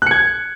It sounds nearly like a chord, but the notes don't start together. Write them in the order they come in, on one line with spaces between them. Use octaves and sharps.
F#6 C#7 G#6